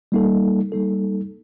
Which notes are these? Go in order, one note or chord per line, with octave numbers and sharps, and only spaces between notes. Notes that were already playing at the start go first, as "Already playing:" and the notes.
G3 A#3 D#4 A4
G3 A#3 D#4 A4